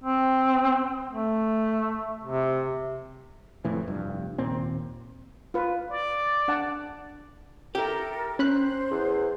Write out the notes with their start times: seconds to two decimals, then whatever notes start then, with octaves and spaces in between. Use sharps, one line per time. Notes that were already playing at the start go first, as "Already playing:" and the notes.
0.04 C4
1.10 A3
2.24 C3
3.65 F2 A2 E3
3.88 F1 G2
4.38 D#2 A#2 C4
5.54 F4 B4
5.91 D5
6.48 D4 F#5 A5
7.75 E4 G4 A4 A#4
8.39 C#4 C5 B5 F#6
8.90 E2